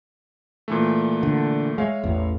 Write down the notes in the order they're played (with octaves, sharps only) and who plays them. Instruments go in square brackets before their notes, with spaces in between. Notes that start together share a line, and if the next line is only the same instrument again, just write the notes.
[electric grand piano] A#2 E3 A3
[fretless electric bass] D3
[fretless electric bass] G#3 [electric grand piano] C#5 E5 F5
[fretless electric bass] A1 E2